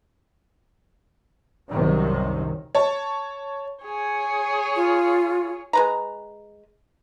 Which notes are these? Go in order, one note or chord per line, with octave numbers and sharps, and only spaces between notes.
C2 F#2 C3 D#3 F#3
C#5 A5
G#4 C#5
F4
G#3 B4 A#5